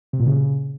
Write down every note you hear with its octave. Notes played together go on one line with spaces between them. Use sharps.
C3
A#2
C#3